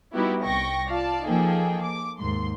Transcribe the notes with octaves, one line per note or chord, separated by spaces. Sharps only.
G3 B3 D#4 E4 F#4 G4
C2 G5 C#6 A#6
F4 D5 F5 A5
F3 A#3 D#4 G#4 A4 G5
D6
D#2 G#2 C6